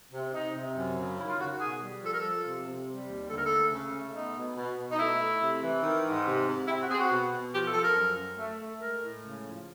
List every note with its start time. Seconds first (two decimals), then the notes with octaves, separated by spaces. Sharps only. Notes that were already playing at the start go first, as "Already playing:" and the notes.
0.12 C3
0.33 C3 D#4
0.55 C3
0.75 F#2
0.97 C#3
1.18 D#3 E4
1.29 F4
1.39 D#3 F#4
1.50 F#4
1.60 B2 G#4
1.81 G3
2.02 F3 A4
2.11 A#4
2.19 F3 A4
2.45 C3
2.66 C3
2.88 G3
3.08 D#2
3.30 D2 A4
3.37 A#4
3.45 A4
3.50 A3
3.71 C#3
3.93 A3
4.14 B3 D#4
4.35 B2
4.57 B2
4.77 B2
4.92 D#4
4.99 A3 E4
5.19 A3
5.41 C3
5.62 E3
5.83 D#3
6.05 G#2
6.26 C3
6.48 C3
6.68 C4 E4
6.79 F#4
6.89 C4 G#4
7.00 F#4
7.11 B2
7.32 B2
7.52 F3 G4
7.63 A4
7.74 F3 A4
7.84 A#4
7.95 F#2
8.16 F#2
8.37 A3
8.59 A3
8.79 G#3 A#4
9.01 A2
9.22 C#3
9.43 F3